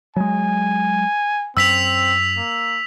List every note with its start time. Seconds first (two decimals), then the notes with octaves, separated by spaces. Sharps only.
0.16 F#3 G#3 G#5
1.57 F#2 C4 E6 B6 F7
2.36 A#3